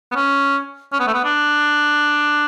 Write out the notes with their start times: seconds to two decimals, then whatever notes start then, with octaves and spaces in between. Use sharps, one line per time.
0.11 B3
0.15 C#4
0.93 C#4
1.00 B3
1.07 A3
1.14 B3
1.24 D4